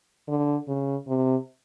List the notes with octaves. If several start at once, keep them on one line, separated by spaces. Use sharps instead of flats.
D3
C#3
C3